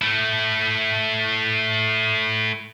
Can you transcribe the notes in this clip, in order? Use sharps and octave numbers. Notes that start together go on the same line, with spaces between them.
A3 E4